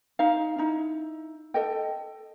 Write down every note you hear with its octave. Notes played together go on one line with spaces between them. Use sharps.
D#4 F5
D#4 E4
A4 D#5 G5